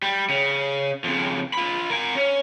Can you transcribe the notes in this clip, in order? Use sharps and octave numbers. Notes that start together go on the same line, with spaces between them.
G3
C#3
F2 C#3
F4 B5
A#4 G#5
C#4